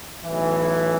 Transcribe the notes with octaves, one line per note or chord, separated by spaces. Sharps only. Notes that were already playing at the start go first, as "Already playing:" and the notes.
B1 A2 E3